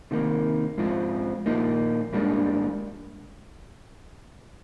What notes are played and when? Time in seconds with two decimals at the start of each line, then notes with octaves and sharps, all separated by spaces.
0.11 C3 D#3 A#3
0.78 G#2 F3 C4 F4
1.46 A#2 F3 A#3 D#4
2.13 G#2 G3 A#3 D4